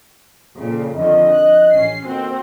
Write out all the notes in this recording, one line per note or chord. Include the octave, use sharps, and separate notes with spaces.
F2 A#2 C#3
F2 D3 D#3 D#5
F#6
A1 C#4 C7
F2 B2 D#3 A#3 C4 F#4